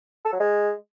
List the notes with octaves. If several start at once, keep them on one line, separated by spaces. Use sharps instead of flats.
A4
F#3
G#3